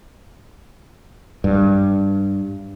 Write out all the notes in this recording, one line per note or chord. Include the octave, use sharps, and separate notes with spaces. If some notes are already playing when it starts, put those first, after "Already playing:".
G2